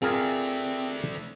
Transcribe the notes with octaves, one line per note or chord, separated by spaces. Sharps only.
A3 C4 D4 F4 G#4 A#4